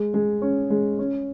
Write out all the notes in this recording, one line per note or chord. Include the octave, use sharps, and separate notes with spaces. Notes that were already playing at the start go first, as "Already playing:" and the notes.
Already playing: G#3
G#3
C#4
G#3
C#4